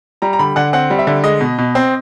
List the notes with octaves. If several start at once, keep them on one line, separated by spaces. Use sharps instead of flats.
G3 A#5
A#5
D3 B5
D3 F#5
C4 F#5
G3
E5
D3
G#3 D#5
B2
B2
C4